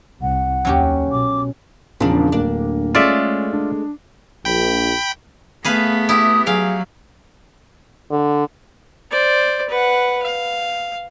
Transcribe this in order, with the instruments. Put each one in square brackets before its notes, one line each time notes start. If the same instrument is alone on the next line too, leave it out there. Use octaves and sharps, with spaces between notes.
[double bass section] C2 [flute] F#5
[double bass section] D#2 [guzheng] F#3 C#4 G4
[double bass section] B2 [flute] D6
[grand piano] E2 C#3 F3 [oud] A#2 D4
[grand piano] D1 A#3 [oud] D4
[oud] G#3 A3 [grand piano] C#4 [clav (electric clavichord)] F4 D5 E5
[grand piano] D4
[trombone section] A#1 [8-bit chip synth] G5 B5
[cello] A3 B3 [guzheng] G#4 B4 F5
[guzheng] E4 G4 [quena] D#6
[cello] F#3 [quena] G#4 [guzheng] F5 G5
[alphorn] D3
[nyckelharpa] C5 D5
B4 F#5
F5